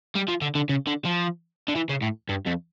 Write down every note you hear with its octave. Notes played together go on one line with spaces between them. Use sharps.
G3
F3
D3
D3
C#3
D3
F3
D3
E3
C#3
A2
G2
F2